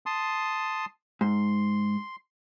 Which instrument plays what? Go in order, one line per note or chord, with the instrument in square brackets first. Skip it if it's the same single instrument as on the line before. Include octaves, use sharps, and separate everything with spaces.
[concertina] A5 C6 D#6
[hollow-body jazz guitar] G#2 [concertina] C6